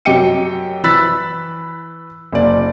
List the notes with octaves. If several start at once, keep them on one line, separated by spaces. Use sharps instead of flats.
F#2 G4 D#5 G5 C#7 D#7
E3 B5 E6 F#6 A6 B6
F#1 D5